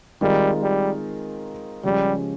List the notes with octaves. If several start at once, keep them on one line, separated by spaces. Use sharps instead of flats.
D#3 G3 G#3 C4 F4 A#4
G3
C#3 F3 G3 G#3 C#4 G4